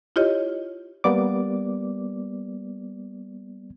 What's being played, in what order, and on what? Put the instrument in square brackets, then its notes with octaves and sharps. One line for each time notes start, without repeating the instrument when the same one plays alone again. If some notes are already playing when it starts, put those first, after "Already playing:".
[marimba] E4 F4 G4 C#5 D#5
[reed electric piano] G3 A#3 B3 D5 D6